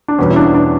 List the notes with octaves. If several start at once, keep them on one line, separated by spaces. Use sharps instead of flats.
D4
E2 B2 G3 B3 C#4
E4
D4
D4